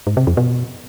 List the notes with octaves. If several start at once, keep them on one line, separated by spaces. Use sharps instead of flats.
G#2
C3
F2
B2